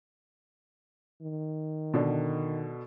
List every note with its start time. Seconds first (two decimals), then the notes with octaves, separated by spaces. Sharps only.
1.22 D#3
1.94 B2 D3